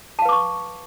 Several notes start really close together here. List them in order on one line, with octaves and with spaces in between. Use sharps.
A5 F5 B4 D6 C#6